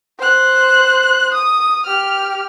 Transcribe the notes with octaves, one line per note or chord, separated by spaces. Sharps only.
C5 F#6
D#6
G4 F6